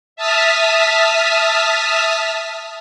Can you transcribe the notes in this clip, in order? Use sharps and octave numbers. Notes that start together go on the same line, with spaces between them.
E5 A5 D#6 F6 B6